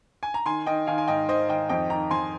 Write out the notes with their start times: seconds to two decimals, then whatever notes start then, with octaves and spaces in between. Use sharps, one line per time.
0.23 G#5
0.34 A#5
0.46 D#3 G#5 C6
0.66 D#3 D#5 G5
0.87 D#3 F5 G#5
0.98 G#5
1.08 G#2 D#5 G5
1.29 D#3 C5 D#5
1.48 D#3 D#5 G5
1.69 F2 D#5 G5
1.90 D#3 G5 A#5
2.11 F2 G#5 C6